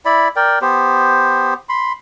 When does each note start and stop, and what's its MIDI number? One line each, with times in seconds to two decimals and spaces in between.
0.05 0.28 64
0.05 0.28 74
0.05 0.28 83
0.36 0.59 70
0.36 0.59 74
0.36 0.59 79
0.62 1.54 59
0.62 1.54 67
0.62 1.54 72
1.69 1.93 83
1.69 1.93 84